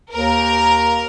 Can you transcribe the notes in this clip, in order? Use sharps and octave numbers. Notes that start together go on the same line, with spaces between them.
D#2 A#4